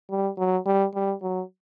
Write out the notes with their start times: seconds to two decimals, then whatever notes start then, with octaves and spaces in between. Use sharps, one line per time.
0.10 G3
0.38 F#3
0.66 G3
0.94 G3
1.22 F#3